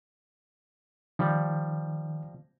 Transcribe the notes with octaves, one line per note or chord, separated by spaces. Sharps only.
D#3 F3 G3